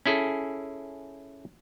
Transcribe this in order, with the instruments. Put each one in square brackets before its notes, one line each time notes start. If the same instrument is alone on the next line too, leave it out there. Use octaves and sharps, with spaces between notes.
[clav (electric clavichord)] C#4 E4 G#4 A4